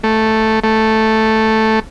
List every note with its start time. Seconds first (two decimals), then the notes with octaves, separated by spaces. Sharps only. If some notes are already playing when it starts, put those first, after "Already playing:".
0.04 A3
0.64 A3